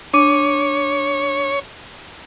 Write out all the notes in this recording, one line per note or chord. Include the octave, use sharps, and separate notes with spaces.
D4 C#5 D6 D#7